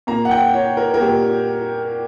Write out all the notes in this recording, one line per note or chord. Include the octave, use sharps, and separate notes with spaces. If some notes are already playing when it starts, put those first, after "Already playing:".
A#2 A#3 A#5
F#5
G5
C#5
A#4
A#4
A#2 A#3 G4